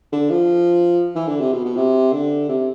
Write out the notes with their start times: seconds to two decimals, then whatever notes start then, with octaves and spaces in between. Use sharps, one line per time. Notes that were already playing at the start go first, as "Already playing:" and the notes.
0.12 D3
0.30 F3
1.15 E3
1.27 D3
1.40 C3
1.53 B2
1.65 B2
1.77 C3
2.13 D3
2.49 C3